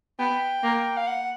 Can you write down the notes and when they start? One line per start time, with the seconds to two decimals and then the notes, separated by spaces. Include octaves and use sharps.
0.19 B3 G5
0.63 A#3
0.97 F5
1.08 F#5